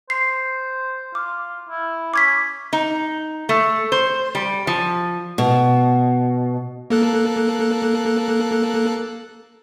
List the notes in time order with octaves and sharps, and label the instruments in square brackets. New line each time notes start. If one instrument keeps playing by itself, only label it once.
[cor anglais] C5 [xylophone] C7
[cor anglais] F4 [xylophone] D6
[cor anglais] E4
[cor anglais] C#4 [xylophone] D6 G#6 B6
[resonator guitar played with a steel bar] D#4
A3
C5
G3
F3
[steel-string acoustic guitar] B2
[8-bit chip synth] A#3 A4 F#6